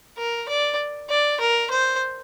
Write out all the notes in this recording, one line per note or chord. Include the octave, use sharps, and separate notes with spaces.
A#4
D5
D5
A#4
C5